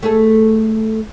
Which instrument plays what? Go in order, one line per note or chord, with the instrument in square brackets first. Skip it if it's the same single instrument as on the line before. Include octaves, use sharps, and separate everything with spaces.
[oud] A3 G#4 A4